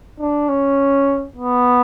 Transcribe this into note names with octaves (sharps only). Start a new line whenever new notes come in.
D4
C#4
B3